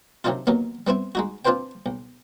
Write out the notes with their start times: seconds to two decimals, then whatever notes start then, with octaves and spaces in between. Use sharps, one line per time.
0.24 C3 D#3 F#3 D4 D#4 F4
0.47 D#2 D#3 F#3 B3
0.87 G3 B3 C4 E4
1.15 G#3 D#4 F#4
1.45 C4 D4 F4 B4 C5 G5
1.86 B1